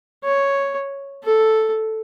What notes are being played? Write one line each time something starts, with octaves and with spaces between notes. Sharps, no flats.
C#5
A4